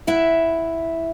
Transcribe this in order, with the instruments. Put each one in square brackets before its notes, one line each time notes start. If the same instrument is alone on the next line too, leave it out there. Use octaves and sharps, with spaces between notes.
[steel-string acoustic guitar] E4 E5 F#5